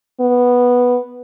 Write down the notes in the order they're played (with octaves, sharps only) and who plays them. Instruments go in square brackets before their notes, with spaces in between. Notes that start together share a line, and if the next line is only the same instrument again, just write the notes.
[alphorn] B3